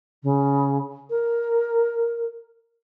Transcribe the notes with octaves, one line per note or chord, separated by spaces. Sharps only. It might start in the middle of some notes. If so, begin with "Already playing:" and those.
C#3
A#4